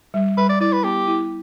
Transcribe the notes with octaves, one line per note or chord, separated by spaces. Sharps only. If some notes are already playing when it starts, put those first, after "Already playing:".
G3
G3 B4
D5
E4 D5
B4
B3 G4
E4